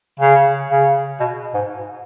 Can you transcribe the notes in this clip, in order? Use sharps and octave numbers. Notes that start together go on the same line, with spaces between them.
C#3
C#3
B2
G#2